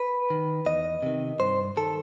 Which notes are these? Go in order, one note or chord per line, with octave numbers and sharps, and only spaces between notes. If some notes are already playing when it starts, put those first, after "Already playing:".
Already playing: B4
D#3
E2 D#5
C3 D#3
G2 C5
D#3 A4